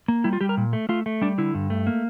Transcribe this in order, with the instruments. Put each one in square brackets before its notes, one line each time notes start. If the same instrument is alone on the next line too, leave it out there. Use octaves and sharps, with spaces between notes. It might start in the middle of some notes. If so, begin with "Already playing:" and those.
[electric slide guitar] A#3
G3 E4
F4
G3 G4
A#4
A#2
A3
A3 F4
A3
G3 D4
D3 E4
G2
A3
A#3